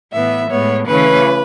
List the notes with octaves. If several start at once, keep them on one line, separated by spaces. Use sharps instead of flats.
A2 E3 B3 E5
A2 G#3 B3 C#5
C#3 E3 A3 C#4 B4